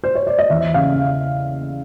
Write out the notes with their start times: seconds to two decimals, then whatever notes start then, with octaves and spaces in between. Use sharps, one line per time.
0.04 C5
0.15 C#5
0.27 D5
0.39 D#5
0.50 E2 E5
0.74 C#3 F5